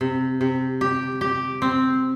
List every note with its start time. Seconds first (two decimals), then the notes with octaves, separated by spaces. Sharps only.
0.01 C3
0.41 C3
0.81 G4
1.21 G4
1.62 C4